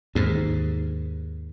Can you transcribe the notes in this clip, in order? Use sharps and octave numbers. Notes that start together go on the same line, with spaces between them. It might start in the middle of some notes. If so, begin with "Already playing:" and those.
D#2 G#2